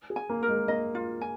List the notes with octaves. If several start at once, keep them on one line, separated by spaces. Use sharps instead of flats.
G#4
G#5
A#3
A#4
G#3
A#3 D#5
F4
G#5